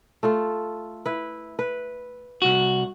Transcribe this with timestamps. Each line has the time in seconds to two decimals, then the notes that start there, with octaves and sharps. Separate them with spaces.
0.23 A3 F4 A4
1.06 E4 B4
1.59 B4
2.42 C2 F#4